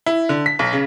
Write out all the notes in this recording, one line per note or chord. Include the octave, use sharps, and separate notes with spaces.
E4
D3
B6
B1
C#3